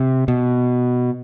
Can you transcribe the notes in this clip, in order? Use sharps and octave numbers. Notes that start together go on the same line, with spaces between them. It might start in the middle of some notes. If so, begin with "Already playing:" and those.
Already playing: C3
B2